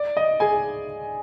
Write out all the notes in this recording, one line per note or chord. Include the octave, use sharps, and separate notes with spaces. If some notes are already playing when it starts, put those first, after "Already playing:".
Already playing: D5
D#5
G#4 G#5